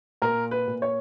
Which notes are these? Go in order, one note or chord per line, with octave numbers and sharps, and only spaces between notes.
A#2 A#4
B4
A#2
C#5